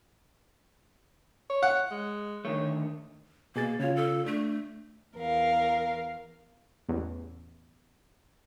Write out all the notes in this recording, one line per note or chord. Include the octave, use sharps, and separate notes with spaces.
C#5
F#5
G#3
D3 D#3 A3 C#5
B2 A#3 G#4 A6
C#3 F4 C#5
A4
A3 D4
E2 A#4 F5
A1 E2